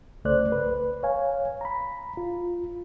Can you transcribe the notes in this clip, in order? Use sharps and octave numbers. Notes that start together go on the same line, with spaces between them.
C2 C#3 A3 C5 D5 F#6
B4
C#5 F5 G#5
A#5 B5
F4